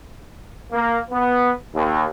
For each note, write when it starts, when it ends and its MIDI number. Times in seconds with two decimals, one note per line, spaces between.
0.72 0.98 58
1.11 1.50 59
1.75 2.07 39